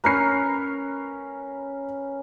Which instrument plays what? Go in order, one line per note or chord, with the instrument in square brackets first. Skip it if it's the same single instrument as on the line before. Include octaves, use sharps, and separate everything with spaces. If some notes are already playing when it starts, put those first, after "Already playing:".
[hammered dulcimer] C#4 A#4 B4 [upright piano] A#5 B5 C7